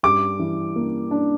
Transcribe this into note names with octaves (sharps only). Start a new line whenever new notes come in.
G2 D6
E3
A#3
D4